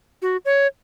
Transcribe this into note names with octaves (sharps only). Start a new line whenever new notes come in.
F#4
C#5